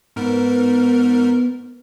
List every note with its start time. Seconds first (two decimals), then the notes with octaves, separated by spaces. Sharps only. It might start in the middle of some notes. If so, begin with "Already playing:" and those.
0.16 G#2 B3 A#4